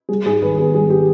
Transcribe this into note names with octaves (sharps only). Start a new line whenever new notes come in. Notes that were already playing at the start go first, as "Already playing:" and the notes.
G3 G#4
G#2 G#4
G#1 B4
B3 G#4
G3 G#4
G4